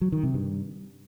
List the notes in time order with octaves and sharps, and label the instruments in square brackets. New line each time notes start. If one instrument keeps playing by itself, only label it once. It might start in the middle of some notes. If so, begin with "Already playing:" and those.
[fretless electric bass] F#3
D#3
C3
G2